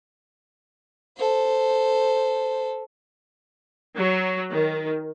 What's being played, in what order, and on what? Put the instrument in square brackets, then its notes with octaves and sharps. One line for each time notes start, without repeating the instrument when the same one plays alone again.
[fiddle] A4 C5
[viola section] F#3
D#3